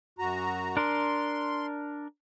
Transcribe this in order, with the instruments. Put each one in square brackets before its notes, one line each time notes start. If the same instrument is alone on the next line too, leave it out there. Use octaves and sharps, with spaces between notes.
[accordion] F#2 F#4 A#5
[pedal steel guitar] D4 A#4 [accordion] C6